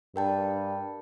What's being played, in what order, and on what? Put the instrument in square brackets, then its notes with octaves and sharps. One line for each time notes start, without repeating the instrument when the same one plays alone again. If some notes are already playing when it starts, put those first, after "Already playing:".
[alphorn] G2 [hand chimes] A#4 G5 A5